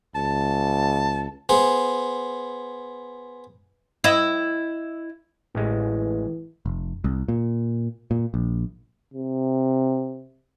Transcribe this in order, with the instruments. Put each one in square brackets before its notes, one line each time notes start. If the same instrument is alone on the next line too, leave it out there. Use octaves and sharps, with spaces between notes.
[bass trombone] C#2 [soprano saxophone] A5
[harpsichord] B3 G#4 C5
[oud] E4 D#5
[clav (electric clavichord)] A1 G#3 [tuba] E3
[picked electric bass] F1
C2
A#2
A#2
A#1
[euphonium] C3